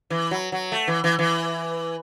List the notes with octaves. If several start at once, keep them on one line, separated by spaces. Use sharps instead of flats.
E3
F#3
F#3
A3
E3
E3
E3